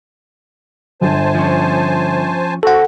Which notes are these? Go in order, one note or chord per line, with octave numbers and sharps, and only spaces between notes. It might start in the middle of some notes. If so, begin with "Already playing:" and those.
G1 C5 G#5 A5
F3 C#4
C4 F#4 A4 F#5